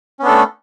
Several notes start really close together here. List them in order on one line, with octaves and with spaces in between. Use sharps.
C#4 B3 D4 A4 A3